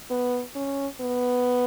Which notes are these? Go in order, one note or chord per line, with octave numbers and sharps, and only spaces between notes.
B3
C#4
B3